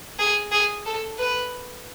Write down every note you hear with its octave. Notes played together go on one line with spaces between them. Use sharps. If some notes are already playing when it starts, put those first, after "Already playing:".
G#4
G#4
A4
B4